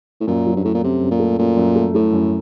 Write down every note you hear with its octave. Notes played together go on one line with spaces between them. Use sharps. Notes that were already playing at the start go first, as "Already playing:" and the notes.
A2
F#2 A#2
F#3
G2
A2 A3
A#2
F#2 C3
F#2
A#2
A3
F#2 A#2
F#2
A3
A2 A3
F#2